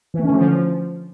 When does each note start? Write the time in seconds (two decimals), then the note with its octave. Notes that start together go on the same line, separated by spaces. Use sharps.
0.14 E3
0.19 A3
0.25 C#4
0.30 D3
0.35 F3